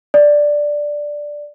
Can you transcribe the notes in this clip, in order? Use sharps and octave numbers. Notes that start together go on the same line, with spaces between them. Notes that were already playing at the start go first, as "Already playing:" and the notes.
D5